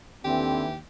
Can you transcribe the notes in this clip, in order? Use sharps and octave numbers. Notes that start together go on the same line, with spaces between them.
D#2 D3 E3 C4 G4